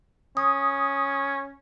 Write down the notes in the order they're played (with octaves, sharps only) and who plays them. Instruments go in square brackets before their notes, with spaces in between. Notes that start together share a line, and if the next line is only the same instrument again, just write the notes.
[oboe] C#4 [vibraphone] D#6